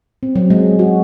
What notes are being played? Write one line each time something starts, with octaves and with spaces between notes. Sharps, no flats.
C4
F#3
G#3
F#4